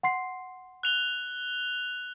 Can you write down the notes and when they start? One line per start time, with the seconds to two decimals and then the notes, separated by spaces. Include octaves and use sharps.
0.03 F#5 C6 C7
0.83 F#6 F7 G7